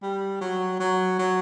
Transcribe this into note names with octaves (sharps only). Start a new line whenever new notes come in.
G3
F#3
F#3
F#3